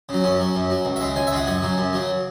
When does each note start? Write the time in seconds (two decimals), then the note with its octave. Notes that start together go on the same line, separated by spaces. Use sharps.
0.09 C#3 F#3
0.24 F#2 C#4
0.40 F#3
0.55 F#2
0.70 F#3
0.85 C#2
0.96 E5
1.01 C#3 G#3
1.16 C#2 G#5
1.27 E5
1.32 C#3 G#3 F#5
1.47 F#2 G#5
1.62 C#3 F#3
1.78 F#2
1.93 C#3 F#3